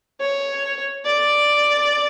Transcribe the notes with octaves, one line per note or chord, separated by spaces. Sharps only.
C#5
D5